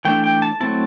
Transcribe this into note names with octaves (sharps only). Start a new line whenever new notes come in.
E3 A3 D4 G5
G5
A5
F#3 A3 C4 E4 A5